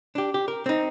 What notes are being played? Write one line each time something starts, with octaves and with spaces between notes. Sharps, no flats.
D4 G4
G4
A#4
C4 D#4